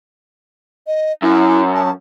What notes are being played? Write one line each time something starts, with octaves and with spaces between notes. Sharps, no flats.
D#5
F#2 E4
A5